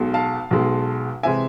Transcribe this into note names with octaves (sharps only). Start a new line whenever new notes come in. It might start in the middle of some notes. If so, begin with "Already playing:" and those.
Already playing: B1 B2 G#3
F5 A5
B1 B2 G#3
C3 E3 G#3 E5 G#5